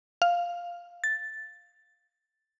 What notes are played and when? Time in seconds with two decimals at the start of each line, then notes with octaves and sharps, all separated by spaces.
0.22 F5
1.04 A6